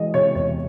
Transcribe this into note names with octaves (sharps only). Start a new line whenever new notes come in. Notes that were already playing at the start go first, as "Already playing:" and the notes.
Already playing: E3 G#3 D#5
C3 C#5
E2 C#5